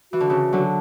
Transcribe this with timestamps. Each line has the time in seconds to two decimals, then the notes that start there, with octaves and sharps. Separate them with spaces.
0.13 E3 F#4
0.20 D3
0.29 C#3 E3
0.52 D3 F#3